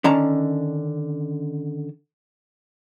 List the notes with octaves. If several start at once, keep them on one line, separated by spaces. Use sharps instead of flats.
D3 D#3 C#4 A5 A#5